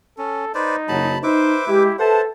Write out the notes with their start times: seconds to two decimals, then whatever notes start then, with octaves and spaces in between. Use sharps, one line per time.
0.18 C#4 A4
0.54 D#4 B4 C5 D5
0.88 F#1 F#3 A5 B5
1.23 D#4 B4 C5 E5 D6
1.67 G#3 E4 G4
1.99 A4 B4 C5 E5 F#5 A5